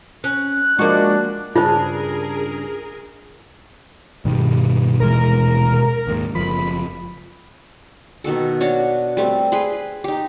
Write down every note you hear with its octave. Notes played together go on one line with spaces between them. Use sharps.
C#4 F#6
F3 G#3 A#3 D4 F#4
G2 C#3 D4 F4 G#4 A#4 C5
G2 B2 D#3 G3
D#1 E3 G#3 A#4
D#2 G#2
F#1 F3 B5
B2 D#3 F#4 A4
D4 F#4 C#5
G3 A3 C4
G#4 B4 B5 C6
D#4 G4